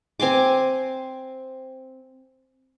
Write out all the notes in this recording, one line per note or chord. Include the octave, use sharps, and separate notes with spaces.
C4 G#5 C6 D6